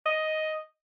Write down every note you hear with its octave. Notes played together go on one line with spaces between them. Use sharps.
D#5